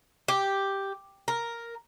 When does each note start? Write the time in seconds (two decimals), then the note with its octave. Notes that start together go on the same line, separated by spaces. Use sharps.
0.28 G4
1.28 A#4